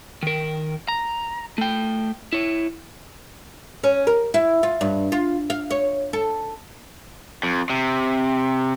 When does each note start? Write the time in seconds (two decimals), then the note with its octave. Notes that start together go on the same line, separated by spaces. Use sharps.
0.23 D#3 A#4
0.88 A#5
1.58 A3 G5
2.33 E4 C#5
3.84 C#4
4.07 A#4
4.34 E4
4.63 F4
4.81 G2
5.12 F4
5.50 F5
5.71 C#5
6.13 A4
7.43 F2
7.70 C3